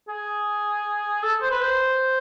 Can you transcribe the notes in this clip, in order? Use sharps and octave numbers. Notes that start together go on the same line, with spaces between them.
G#4
A4
C5
B4
C5